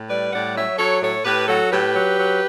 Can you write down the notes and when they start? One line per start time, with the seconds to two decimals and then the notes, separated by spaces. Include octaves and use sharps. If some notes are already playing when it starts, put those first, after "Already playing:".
Already playing: A2
0.09 G3 B4 D5
0.32 A2 D5 F#5
0.55 F#3 C#5 E5
0.78 F#3 A4 C#5
1.01 A2 A4 C#5
1.24 A2 G4 B4
1.47 F#3 F#4 A4
1.70 A2 G4 B4
1.94 F#3
2.18 F#3